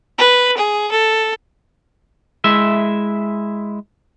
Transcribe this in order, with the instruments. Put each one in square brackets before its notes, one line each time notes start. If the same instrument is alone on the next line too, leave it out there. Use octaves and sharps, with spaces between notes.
[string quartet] B4
G#4
A4
[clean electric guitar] G#3 E4 E5